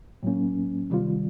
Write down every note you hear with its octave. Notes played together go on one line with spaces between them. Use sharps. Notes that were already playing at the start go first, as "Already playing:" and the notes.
A2 F#3 A#3 C#4
C3 D#3 G3 C4 F4